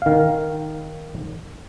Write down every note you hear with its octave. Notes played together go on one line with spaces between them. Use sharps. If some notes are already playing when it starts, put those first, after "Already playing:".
D#3 F5